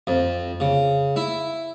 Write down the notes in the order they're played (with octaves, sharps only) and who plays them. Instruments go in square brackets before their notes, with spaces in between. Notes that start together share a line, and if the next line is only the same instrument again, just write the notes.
[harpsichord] F2
C#3
E4